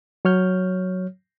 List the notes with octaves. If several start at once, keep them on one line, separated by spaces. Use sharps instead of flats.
F#3 C#5 F6 G6